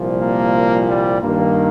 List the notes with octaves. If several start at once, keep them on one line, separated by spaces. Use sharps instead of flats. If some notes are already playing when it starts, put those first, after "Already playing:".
Already playing: C2 A#2 F3
A#3
G3
G2 D#3 A#3